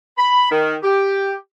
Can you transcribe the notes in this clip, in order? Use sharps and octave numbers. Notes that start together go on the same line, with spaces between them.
B5
D#3
G4